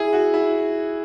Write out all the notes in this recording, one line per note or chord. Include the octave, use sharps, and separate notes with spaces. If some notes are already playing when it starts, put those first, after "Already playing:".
Already playing: E4 G#4
F#4
E4